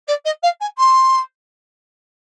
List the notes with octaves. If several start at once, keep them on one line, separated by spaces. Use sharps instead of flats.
D5
D#5
F5
G#5
C6